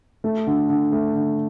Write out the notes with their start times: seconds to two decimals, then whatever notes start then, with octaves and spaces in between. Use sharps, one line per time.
0.24 A3
0.47 D3
0.69 D3
0.92 A3
1.15 D3